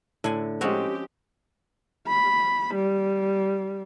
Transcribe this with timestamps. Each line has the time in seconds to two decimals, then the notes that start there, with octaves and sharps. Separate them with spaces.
0.24 A2 D3 E4 G#5
0.61 F3 G#3 C4 C#4 F#4 G4
2.08 B5
2.75 G3